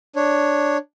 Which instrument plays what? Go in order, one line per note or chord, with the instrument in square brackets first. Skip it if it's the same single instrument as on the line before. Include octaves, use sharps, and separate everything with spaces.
[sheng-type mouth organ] D4 C#5